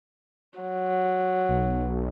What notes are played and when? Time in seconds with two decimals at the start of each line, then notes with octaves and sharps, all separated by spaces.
0.59 F#3
1.49 B1